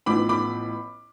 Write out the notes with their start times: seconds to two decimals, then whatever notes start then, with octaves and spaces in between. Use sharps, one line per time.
0.06 A1 A2 F3 B3 B5 D6
0.29 B5 D6